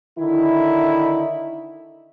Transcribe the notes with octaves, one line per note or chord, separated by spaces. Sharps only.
D3 D#3 E4